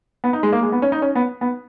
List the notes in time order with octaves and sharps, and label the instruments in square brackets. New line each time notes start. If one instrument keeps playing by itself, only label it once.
[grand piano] B3
D#4
G#3
A#3
G#3
B3
C#4
D#4
C#4
B3
B3